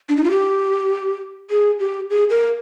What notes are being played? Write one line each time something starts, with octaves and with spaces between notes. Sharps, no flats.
D4
D#4
F4
G4
G#4
G4
G#4
A#4